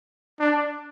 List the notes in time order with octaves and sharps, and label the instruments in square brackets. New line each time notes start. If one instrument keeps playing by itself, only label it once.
[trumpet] D4